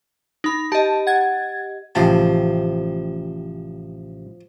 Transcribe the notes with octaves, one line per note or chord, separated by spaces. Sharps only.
D#4 B5
G4 D#5 A5
F#5 G#6 A6
A1 C3 F3 F5 A5